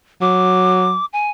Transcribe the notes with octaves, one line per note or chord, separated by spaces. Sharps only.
F#3 D6
G#5